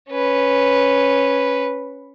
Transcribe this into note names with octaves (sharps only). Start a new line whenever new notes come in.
C#4 B4